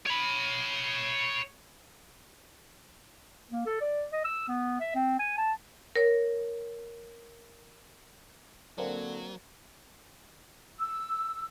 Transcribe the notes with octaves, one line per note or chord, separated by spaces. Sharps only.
C#5 B5
A#3
A4
D5
D#5
E6
B3
E5
C4
G#5
A5
A#4 C#5
D3 F#3 A#3 C4 D4
E6